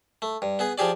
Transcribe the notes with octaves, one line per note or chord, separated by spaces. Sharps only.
A3
G2
B3 G#4
F3 G4 G#4 D5